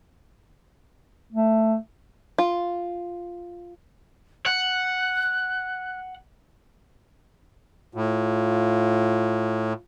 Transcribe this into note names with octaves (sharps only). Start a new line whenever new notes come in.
A3
F4
F#5 F#6
A2 F4